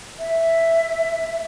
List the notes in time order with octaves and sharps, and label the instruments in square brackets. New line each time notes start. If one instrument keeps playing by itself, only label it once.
[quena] E5